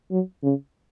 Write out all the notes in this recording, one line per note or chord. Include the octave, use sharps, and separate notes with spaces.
F#3
C#3